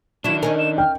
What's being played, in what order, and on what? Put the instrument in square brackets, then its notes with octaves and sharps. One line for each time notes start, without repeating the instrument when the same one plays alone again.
[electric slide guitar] D#3 D4 [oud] F#3 E4 [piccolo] E7
[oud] C#4 D#4 A#4 [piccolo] G#5
[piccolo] E7
[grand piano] G5 [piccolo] F6